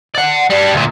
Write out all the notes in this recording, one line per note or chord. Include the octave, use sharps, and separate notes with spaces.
D5 F#5
G3 D4
D2 A#2